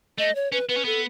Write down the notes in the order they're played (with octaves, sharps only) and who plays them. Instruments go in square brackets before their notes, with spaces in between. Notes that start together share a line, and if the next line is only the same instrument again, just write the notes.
[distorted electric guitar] A3 [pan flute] D#5
[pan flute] C#5
[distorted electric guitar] C#4 [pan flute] B4
[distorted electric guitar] B3 [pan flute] B4
[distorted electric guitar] C#4
[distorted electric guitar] B3 [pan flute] A4